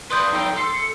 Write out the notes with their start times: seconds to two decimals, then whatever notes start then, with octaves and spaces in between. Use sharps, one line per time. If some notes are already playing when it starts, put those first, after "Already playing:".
0.10 B4 D5 B5 C6 D#6 G6
0.33 D#4 A4 G5
0.57 A4 C6 C7
0.74 C#7